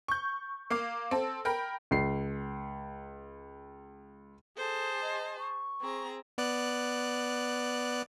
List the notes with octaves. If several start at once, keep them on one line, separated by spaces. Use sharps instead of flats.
C#6 G6
A#3 F5 D6
C4 A4
A#4 G5 B5
C#2 C7
G#4 A4 C5 A5
D#5
C#6
C4 G#4 A#5
B3 D5 F#6